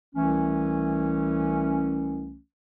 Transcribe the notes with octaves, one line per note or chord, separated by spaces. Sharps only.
C2 E3 A3 C#4